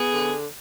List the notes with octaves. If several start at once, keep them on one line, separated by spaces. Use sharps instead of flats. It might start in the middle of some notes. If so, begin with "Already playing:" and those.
Already playing: B3 G#4
D3